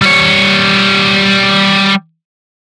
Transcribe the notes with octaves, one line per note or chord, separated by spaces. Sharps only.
G3 C#5